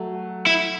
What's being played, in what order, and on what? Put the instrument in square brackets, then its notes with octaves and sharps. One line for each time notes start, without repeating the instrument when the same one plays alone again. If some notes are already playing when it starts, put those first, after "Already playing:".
Already playing: [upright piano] F#3 A3
[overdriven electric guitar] E4